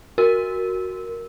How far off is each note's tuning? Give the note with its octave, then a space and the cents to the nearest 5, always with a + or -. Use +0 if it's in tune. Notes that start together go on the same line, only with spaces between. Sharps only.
F#4 +0 A#4 +0